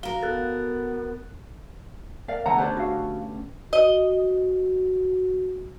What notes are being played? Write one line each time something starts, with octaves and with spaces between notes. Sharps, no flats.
F#4 A#4 F5 G7
B3 A4 F#6 A6
A#4 D5 F5
D3 A3 B3 F#5 A5 A#5
C#4 G4 B4 C5 D5
F#4 F5
F#4 D#5